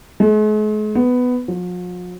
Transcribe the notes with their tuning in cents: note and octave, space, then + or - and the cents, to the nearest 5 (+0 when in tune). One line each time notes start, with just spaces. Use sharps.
G#3 +45
B3 +10
F3 +45